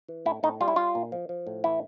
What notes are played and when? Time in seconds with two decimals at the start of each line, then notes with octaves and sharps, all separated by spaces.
0.08 E3
0.26 A2 E4
0.43 A2 D#4
0.61 G3 F4
0.68 E4
0.76 G3 F4
0.95 A#2
1.12 F3
1.29 F3
1.47 A2
1.64 E3 E4